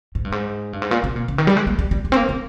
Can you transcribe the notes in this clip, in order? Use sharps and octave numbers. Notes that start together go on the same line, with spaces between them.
G#2
G2
G#2
G2
G#2
A#2
C3
A#2
C#3
D#3
G3
G#3
A#3
G3
G3
G#3
C4
A#3
C4